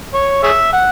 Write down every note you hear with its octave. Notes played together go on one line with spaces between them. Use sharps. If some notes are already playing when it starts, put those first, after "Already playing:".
C#5
G#4 C#5 E5
F#5